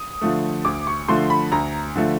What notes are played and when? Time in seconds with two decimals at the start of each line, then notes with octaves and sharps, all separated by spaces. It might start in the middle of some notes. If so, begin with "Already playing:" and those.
Already playing: D#6
0.21 D3 F3 A3
0.65 D2 D6
0.87 C#6
1.08 D3 F3 A3 C6
1.30 B5
1.52 D2 A#5
1.96 D3 F3 A3